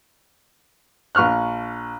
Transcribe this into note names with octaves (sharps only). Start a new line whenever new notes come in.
A#1 C#6 F6 F#6